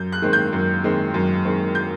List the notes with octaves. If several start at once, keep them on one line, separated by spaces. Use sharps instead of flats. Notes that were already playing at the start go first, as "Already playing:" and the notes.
Already playing: F#2 G6
F#6
D#3 G#3 C4
G6
F#2
D#3 G#3 C4
F#2
D#3 G#3 C4
G6